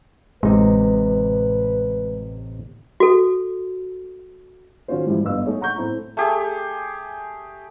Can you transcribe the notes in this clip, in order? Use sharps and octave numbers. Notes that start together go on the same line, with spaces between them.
A1 C3 G#3 D#4 B4
F#4 A4
D#3 C#4 F4 F#4 C5
G#2 E3 F3 G3 E4
G1 D4 B4 D#5 F5 E6
A3 D#4 G#4 C#5
F#5 A#5 C#6 G6
A2 A3 C4 E4
A3 G4 G#4